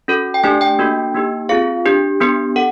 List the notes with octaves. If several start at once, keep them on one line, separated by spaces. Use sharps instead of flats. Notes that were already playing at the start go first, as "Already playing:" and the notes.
C#4 F#4 A4
G5
A3 D4 G4 G#5
G5
A#3 D4 F#4 A4
A#3 D#4 G4
C4 F4 G#4 F5
D4 G4
B3 D4 G4
A4 F#5